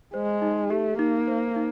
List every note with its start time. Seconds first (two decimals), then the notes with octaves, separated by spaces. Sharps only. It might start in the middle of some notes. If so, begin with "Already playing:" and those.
0.14 G#3 C5
0.42 D#4
0.70 A3 G4
0.99 A#3 D#4
1.28 C5
1.56 D#4